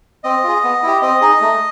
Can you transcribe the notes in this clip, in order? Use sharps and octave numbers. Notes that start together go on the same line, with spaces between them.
C4 D#5
F4 G#4
B3
E4 G4
C4 D#5
D#4 G#4
A3